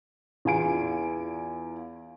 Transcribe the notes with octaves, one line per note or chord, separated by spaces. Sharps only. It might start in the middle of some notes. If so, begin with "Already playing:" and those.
E2 F4 G#5 D7